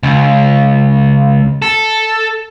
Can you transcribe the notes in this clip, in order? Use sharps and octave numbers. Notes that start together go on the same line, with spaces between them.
C#2
A4